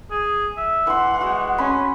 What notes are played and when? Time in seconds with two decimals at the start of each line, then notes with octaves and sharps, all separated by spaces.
0.11 G#4
0.57 E5
0.87 E3 F#5 C6
1.21 G#3 F#4
1.58 C#4 B5 C6